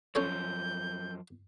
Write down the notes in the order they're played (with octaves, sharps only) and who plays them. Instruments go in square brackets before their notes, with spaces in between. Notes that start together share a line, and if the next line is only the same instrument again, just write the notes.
[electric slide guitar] F#2 F3 [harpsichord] C#4 A4 C#5 [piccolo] G6